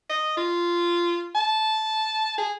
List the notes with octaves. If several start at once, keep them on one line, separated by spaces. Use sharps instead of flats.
D#5
F4
A5
G#4